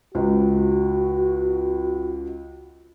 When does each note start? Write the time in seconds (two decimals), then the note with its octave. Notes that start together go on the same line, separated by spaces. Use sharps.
0.15 C#2 F#4